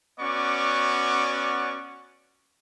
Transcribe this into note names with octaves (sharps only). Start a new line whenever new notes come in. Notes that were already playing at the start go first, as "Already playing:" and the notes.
B3 C#4 F#4 D5 C#6 D6